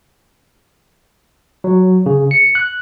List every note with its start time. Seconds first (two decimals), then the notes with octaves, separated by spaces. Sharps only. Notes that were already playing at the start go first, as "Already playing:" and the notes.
1.64 F#3
2.06 C#3
2.31 C#7
2.55 F#6